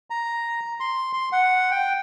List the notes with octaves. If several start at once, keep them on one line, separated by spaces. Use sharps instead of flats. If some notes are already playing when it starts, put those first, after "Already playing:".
A#5
C6
C6
F#5
G5